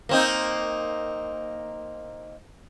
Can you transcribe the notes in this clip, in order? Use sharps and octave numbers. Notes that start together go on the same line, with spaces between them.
A#3 C4 D#4